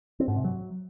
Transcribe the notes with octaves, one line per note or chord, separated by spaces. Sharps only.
C4
G#2
C3
F#3